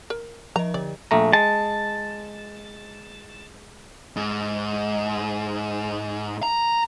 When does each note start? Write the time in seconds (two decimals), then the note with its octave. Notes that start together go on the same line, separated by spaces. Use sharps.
0.10 A#4
0.56 F3 D#5 A#5
0.74 D3 D5
1.11 A#1 A3 A#5
1.33 G#3 A5
4.16 G#2
6.43 A#5